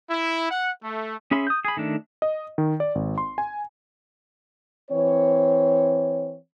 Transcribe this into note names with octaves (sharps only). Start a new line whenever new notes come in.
E4
F#5
A3
C#4 G#4 E5 B5 C6
D#6 G6
G#4 B5
D#3 A3 D4
D#5
D#3
D5
G#1
C6
G#5
E3 C4 C#5